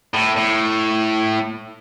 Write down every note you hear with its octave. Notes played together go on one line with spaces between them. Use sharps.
A2
A2